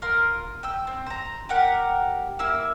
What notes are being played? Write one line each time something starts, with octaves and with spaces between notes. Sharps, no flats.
F4 A#4 C6
G5 E6
C4
C5 A#5
G4 A#4 F#5
A#3 E4 E6